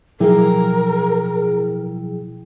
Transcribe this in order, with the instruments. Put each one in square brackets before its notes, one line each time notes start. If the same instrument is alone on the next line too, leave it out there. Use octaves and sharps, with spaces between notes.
[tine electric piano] B2 F3 G5 [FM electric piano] F#3 E4 G#4 [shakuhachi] A#4